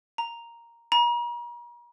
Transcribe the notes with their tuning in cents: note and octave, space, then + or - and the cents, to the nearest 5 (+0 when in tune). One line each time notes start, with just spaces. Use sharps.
A#5 +0
A#5 +40